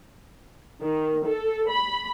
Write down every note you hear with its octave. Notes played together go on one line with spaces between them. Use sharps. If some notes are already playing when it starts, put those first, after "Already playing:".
D#3
A4
B5